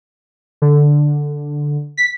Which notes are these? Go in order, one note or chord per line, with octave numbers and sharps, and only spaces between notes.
D3
B6